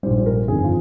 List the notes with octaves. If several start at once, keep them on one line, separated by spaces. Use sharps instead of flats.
A#1 G#2 G3 C5
C5
A#4
G1 F2 D#3 G#4
F4